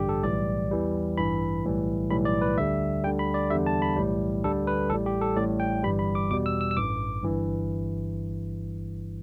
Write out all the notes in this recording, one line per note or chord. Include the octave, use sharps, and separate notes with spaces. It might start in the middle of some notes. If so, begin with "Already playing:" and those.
Already playing: A1 G2 D3 G3 G4
A4
B1 A2 E3 G3 D5
E2 E3 G3
A1 G2 E3 B5
B1 A2 E3 G3
B1 A2 E3 G3 B5
D5
B4
D2 D3 G3 E5
D2 D3 G3 G5
B5
D5
E2 D3 G3 E5
A5
B5
B1 A2 E3 G3
D2 D3 G3 A4
B4
A1 A2 G3 A4
G4
A4
A1 A2 G3 D5
G5
G1 G2 E3 G3 B5
B5
D6
E2 B2 G3 D6
E6
E6
E6
A1 G2 E3 D6
G1 G2 E3